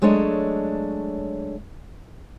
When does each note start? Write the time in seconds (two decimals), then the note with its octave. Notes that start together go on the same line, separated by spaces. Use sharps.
0.02 F#3 G#3 A3 D4 C#5 D#5